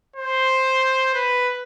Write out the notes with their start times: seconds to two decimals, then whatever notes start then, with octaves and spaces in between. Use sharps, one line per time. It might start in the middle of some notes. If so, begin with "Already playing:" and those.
0.16 C5
1.14 B4